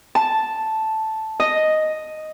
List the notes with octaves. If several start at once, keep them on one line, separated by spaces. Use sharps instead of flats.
A5
D#5